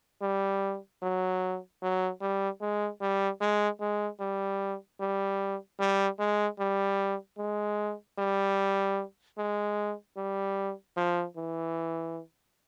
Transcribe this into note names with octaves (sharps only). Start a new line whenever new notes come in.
G3
F#3
F#3
G3
G#3
G3
G#3
G#3
G3
G3
G3
G#3
G3
G#3
G3
G#3
G3
F3
E3